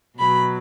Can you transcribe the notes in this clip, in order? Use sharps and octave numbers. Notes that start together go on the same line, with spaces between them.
B2 F#3 B5